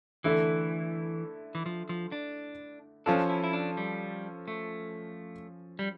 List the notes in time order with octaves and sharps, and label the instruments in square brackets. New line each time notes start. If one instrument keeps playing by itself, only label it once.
[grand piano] D3 A3 E4 [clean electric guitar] E3
[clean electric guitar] E3
F3
F3
D4
[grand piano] F3 C#4 F4 A4 [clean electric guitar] D4
[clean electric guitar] E4
E4
D4
G3
A3
G3